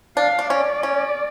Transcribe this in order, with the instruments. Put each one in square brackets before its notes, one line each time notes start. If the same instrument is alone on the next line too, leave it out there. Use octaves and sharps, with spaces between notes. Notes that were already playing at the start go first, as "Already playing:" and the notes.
[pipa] D4 [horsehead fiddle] F5
[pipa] D4
[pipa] C#4 [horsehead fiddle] D5
[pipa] C#4